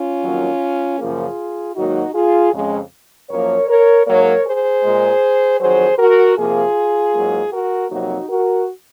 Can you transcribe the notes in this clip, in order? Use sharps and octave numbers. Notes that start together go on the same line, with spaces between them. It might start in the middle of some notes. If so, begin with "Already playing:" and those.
Already playing: C#4 F4
F2 D#3 F#3 A#3
F#2 C#3 F3 A#3 F4 G#4
G#2 D#3 F#3 A#3 D#4 F#4
F4 G#4
F2 C#3 G#3
F#2 F3 A#3 A#4 C#5
A#4 C#5
G#2 F#3 A#3 A#4 C#5
G#4 C5
A#2 G#3
F2 D#3 F#3 G#4 C5
F#4 A#4
C3 F3 A#3 F4 G#4
G#2 F#3 A#3
F#4 A#4
F2 C3 F#3 A#3 D#4 F#4
F#4 A#4